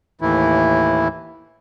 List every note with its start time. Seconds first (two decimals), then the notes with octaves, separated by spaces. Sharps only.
0.21 D#2 A2 E3 E4